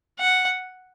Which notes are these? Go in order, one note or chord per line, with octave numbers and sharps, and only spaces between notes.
F#5